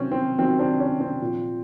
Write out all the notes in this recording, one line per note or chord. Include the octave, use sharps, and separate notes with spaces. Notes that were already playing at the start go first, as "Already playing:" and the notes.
Already playing: C3 D#3 F#3 C4 C#4
C4
C3 D#3 F#3 C4
C4 D4
C#4
C4
A#2 F3